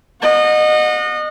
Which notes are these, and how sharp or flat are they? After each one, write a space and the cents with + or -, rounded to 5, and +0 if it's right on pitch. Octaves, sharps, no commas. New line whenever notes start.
D#5 -25 F#5 -35